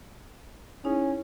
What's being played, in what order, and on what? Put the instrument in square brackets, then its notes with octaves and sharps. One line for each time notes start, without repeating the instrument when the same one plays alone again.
[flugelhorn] C#4 [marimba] D#4 E4 G#4